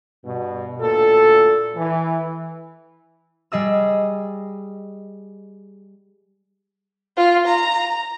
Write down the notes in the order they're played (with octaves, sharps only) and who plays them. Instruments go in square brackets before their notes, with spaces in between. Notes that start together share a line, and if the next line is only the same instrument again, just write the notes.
[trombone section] G2 B2
D2 A#2 A4
E3
[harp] G3 G#4 D#5 E6
[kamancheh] F4
A#5